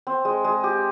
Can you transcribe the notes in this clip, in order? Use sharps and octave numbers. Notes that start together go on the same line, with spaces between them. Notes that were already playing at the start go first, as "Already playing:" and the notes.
C4
G#3
G#3
G4